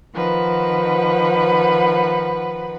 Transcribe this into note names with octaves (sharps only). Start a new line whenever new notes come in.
D#3 F3 B4 F#5